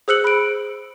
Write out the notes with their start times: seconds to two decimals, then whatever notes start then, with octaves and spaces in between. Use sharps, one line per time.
0.08 G#4 C5 E6 F#6 C#7 F#7
0.24 B5 D7